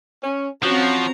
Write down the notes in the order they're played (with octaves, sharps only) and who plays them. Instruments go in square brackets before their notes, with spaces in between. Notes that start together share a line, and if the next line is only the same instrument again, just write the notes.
[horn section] C#4
[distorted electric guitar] F3 [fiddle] C4 A#5 [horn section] C#4 F#4